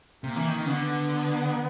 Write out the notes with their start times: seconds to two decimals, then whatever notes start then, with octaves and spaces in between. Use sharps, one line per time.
0.24 C3 A#3
0.36 E3
0.48 D#3
0.58 D#3
0.66 C#3
0.70 D3 B3